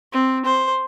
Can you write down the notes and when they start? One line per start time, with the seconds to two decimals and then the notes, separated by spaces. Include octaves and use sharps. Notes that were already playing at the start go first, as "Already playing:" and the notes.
0.13 C4
0.46 C5